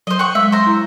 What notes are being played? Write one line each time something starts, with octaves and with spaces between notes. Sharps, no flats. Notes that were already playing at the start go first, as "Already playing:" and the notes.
F#3 C5 D#5
F#5 C#6
G#3 E5
C5 A#5
E4